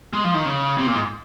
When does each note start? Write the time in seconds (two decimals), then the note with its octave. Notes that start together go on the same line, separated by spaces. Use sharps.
0.13 G#3
0.24 F3
0.34 D#3
0.45 C#3
0.78 C3
0.86 A#2
0.95 G#2